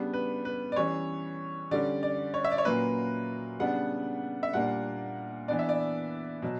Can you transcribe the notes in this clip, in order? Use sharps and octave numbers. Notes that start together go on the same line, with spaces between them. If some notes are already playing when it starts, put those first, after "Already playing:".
Already playing: C#3 G3 B3 D4
B4
B4
D5
E3 G3 C#4 C#5
D3 G3 C#4 D5
D5
C#5
E5
D5
C#5
A#2 F#3 A#3 C#4 B4
C#3 G3 B3 D4 F#5
E5
A#2 G3 A#3 D4 F#5
E3 B3 D4 D5
E5
D5
B2 F#3